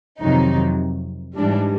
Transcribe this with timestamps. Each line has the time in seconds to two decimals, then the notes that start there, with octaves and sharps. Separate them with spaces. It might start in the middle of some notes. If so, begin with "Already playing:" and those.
0.21 F2 C3 D#3 F#3 D#4
1.37 G#2 E3 G3 D4